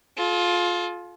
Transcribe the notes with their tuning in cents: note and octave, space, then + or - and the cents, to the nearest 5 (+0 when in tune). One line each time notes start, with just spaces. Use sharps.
F4 +15 A4 -45